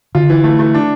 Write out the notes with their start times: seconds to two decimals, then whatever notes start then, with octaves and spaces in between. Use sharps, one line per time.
0.15 D3 F4
0.30 E3
0.44 A3
0.59 A3
0.74 D4